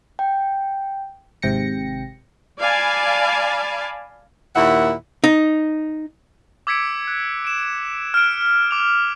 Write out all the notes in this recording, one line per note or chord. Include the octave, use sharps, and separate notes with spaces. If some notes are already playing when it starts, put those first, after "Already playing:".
G5
G#1 G#2 C3 G5 A#6 C#7
D5 F5 G#5 A5 B5
D#2 A#2 E4 E5 F#5
D#4
D6 E6 G#6 B6 C#7 D7
F#6
D7 E7
F6 D7
D6 F7